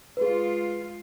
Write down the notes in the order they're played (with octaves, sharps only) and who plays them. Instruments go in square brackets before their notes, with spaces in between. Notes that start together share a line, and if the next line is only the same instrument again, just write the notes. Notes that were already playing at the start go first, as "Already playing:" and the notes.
[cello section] G#3 F4 [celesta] G#4 B4